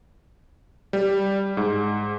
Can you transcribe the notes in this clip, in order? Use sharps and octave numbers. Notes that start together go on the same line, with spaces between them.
G3
G#2